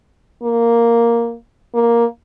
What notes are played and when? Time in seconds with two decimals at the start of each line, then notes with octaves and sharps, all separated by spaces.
0.43 A#3
1.74 A#3